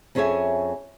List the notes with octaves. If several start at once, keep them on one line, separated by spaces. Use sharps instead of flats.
F2 C#4 G#4 C#5 E5 G#5